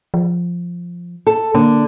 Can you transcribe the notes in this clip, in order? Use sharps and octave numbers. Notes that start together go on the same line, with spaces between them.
F3
A4
D3 A#3